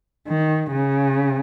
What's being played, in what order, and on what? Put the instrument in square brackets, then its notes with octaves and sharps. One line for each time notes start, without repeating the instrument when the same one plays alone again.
[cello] D#3
C#3